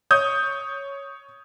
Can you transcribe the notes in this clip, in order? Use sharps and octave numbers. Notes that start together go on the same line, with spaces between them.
C#5 D#6 G6